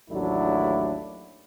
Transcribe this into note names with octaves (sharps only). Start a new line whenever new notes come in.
A1 D#2 F#3 A3 D4 E4